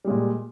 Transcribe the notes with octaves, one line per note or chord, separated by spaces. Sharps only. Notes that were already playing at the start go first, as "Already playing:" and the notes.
A#2 G3 G#3